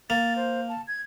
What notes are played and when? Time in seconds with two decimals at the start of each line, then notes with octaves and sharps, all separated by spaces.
0.10 A#3 A6
0.36 C5
0.68 A5
0.88 G#6